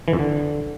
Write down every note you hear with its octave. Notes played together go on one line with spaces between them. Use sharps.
E3
F2
D3